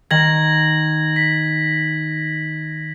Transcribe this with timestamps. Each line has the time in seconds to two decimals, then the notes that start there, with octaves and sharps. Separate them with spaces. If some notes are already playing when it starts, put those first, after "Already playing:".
0.11 D#3 G#6 A#6 F#7
1.16 B6